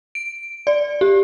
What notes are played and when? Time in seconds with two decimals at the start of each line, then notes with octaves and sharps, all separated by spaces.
0.15 D7
0.67 D5
1.01 G4